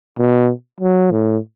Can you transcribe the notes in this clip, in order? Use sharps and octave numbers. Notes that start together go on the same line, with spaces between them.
B2
F#3
A2